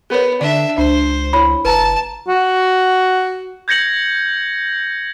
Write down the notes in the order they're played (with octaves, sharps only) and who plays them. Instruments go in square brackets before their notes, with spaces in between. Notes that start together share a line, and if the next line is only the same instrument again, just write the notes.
[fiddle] B3 [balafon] G#4 A#4 C#5
[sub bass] D3 [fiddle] D4 E5 [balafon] D5
[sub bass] C#2 [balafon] D4 [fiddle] C5
[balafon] E4 C#5 [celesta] B5
[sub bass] F#1 [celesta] B4 A#5 [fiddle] A5
[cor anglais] F#4
[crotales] G6 G#6 A#6 C#7 F#7